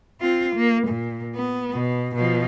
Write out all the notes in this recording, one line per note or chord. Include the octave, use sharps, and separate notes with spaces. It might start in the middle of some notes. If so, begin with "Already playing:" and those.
C4 F4
A#3
A#2
B3
B2
B2 F3